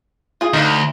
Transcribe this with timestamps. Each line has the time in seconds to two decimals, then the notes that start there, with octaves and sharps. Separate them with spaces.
0.41 F4 G#4
0.53 D2 D#4 G4 F5